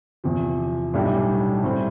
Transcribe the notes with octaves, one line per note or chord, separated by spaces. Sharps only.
E2 C3 F3
B1 A2 G3 D4 G4
A2 G3 C4